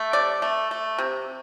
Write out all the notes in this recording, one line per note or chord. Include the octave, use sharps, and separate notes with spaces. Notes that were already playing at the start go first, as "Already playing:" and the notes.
Already playing: A3
C3 D5
A3
A3
C3